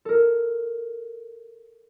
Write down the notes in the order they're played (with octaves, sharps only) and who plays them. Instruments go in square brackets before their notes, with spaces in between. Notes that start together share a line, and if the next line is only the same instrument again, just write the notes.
[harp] A4 A#4